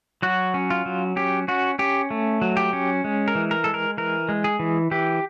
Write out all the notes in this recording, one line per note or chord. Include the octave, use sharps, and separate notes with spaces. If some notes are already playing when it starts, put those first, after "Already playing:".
F#3 F#4
C#4
F4
F#3
C#4 G4
C#4 F#4
C#4 G4
A3
F#3
G4
C#4
G#3
A#4
E3
A#4
G#3 A4
A#4
E3 A#4
G#3
G#4
E3
E3 G4